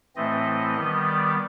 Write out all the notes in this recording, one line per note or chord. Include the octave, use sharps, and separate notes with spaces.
A2 E3 A3 C4 D#5
D#3 G3 B3
D5